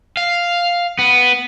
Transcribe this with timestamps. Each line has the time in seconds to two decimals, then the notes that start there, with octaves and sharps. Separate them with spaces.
0.17 F5
0.99 B3